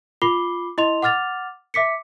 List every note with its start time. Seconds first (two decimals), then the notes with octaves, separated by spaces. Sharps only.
0.22 F4 B5 D6 C7 G7
0.78 E4 D#5 C6 F7
1.02 F#5 D6 F6 A6 F7
1.74 E5 D6 B6 C#7